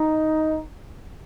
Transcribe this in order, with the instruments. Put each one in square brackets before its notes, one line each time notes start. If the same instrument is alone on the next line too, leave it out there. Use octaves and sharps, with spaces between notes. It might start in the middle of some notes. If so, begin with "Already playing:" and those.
Already playing: [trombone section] D#4